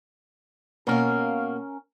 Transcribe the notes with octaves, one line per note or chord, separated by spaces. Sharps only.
B2 A#3 C#4 A#4 F5